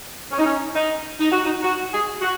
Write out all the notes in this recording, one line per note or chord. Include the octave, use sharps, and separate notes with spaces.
C#4
D#4
C#4
D#4
D#4
F#4
D#4
F#4
G#4
F#4